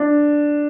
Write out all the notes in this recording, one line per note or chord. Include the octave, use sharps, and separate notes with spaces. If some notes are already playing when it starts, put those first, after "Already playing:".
Already playing: D4